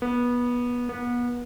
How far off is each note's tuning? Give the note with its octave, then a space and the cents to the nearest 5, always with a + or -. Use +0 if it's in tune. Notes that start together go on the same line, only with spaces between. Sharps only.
B3 -20
B3 -30